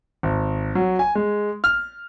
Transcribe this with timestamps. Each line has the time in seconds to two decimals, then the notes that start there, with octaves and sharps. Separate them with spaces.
0.23 G#1
0.75 F#3
0.99 G#5
1.15 G#3
1.64 F6